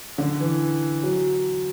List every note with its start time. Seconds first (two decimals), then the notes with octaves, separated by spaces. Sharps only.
0.18 D3
0.40 E3
1.03 F#3